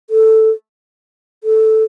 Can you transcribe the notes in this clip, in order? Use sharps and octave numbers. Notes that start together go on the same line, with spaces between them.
A4
A4